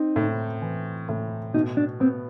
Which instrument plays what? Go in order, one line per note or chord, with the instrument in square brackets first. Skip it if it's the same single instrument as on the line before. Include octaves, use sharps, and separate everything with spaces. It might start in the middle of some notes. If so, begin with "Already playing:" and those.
Already playing: [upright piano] C4 [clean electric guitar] D#4
[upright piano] A2
E3
A2
[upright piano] B2 [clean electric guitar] D#4
[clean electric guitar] D4
[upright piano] B3 [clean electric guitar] C4